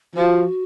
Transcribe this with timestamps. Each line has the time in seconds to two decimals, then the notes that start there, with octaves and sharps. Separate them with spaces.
0.16 F3 F#4